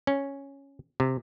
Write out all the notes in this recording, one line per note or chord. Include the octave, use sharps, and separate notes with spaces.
C#4
C3